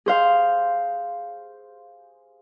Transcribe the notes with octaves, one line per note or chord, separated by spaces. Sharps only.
G#4 C5 F5